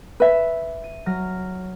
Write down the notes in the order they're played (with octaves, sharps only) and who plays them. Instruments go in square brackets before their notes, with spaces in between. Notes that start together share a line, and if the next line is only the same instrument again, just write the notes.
[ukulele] B4 E5
[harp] D#7
F#3 F6 A#6